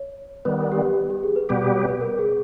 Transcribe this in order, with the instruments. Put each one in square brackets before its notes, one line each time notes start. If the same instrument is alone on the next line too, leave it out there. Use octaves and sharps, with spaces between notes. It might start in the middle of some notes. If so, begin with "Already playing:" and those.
Already playing: [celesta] C#5
[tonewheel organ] D#3 G3 B3 [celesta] B4
[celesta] G4
G4
G#4
B4
[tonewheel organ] B2 G3 B3 G4 [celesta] B4
[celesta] B4
C#5
B4
A#4
G#4